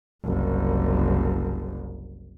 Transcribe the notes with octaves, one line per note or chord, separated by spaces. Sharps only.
F#1 C2